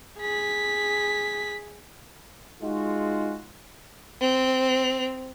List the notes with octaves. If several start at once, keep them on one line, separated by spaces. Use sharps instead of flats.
G#4 B6
G#3 D#4 F4 F#4
C4